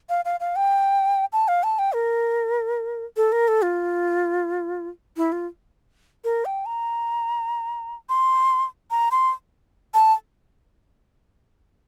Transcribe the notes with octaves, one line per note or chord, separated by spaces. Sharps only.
F5
F5
F5
G5
A5
F5
A5
G5
A#4
A4
A#4
A4
F4
E4
F4
A#4
G5
A#5
C6
A#5
C6
A5